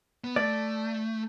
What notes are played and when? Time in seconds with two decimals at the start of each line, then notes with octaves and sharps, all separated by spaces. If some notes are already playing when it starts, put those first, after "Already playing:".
0.24 B3
0.36 A3 D5